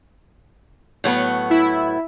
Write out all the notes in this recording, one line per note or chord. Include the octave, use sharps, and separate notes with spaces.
A2 F#3 B3
E4